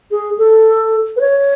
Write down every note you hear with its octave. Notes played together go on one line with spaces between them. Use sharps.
G#4
A4
B4
C#5